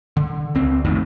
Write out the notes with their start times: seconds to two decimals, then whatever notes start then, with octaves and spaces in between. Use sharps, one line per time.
0.17 D3
0.55 C#2 C4
0.85 C2 F2 A2 D#3